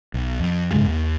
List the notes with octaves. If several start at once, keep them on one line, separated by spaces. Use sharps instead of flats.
B1
F2
F2 G#2 C#3 G#3
D#2